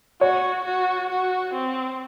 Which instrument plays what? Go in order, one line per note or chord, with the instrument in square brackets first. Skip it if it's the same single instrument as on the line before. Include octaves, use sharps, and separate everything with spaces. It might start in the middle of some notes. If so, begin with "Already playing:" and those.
[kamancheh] F#4 [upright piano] C#5
[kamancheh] F#4
F#4
C4